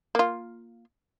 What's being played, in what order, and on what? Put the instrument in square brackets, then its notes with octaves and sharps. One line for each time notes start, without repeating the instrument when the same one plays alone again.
[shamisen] A#3 F4